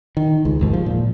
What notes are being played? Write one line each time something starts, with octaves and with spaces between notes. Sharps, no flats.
D#3
C#2
G#1 D#2 G#2
F3
A#2